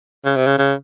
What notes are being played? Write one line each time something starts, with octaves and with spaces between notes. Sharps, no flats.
C#3
C3
C#3
C#3